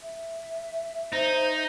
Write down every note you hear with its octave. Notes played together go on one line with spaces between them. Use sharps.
E5
D#4 C5